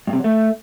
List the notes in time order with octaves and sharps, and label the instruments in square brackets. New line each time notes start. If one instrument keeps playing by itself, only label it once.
[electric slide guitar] G2
C3
F#3
A3